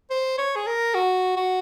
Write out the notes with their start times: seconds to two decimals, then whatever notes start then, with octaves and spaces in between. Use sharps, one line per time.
0.10 C5
0.38 C#5
0.56 G#4
0.67 A#4
0.94 F#4
1.37 F#4